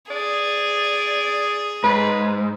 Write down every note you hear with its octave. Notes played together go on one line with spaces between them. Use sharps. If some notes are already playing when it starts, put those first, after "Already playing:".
G#4 D5
G#2 B4